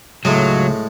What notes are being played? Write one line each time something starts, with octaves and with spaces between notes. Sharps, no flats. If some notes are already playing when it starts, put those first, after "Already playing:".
C#2 A2 F#3 G#3